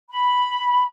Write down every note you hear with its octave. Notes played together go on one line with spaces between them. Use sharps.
B5